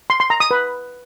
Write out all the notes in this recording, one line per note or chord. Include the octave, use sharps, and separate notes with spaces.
C6
C6
A#5
D#6
B4